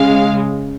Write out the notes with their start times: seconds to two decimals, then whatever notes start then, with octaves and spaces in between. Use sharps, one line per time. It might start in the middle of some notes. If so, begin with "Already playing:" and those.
Already playing: C#3 G#3 F5